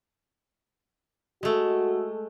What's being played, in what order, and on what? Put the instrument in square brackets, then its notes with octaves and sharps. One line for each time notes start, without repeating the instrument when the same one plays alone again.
[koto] G#3 A3 [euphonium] F#4